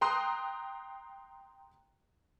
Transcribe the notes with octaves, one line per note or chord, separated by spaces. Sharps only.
G5 A#5 C6 D#6 F#6